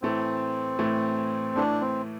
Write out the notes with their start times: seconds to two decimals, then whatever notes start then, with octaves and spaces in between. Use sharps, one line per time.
0.02 A2 E3 A3 C4
0.79 A2 E3 A3
1.56 A2 E3 A3 D4
1.81 C4